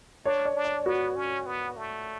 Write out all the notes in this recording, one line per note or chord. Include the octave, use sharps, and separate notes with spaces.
D4 C#5
D5
D4
D5
B3 F#4
C#4
B3
A3